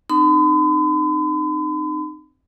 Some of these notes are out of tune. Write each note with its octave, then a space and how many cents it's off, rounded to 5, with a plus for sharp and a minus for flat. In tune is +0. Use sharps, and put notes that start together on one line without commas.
C4 +0 D#4 -30 B5 +45